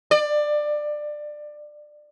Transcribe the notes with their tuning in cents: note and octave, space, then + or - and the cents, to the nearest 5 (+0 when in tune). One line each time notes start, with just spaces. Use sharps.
D5 +20